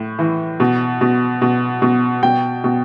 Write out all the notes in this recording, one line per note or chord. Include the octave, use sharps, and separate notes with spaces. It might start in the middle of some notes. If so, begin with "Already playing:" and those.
Already playing: A2
E3
B2
B2
B2
B2
B2 G5
B2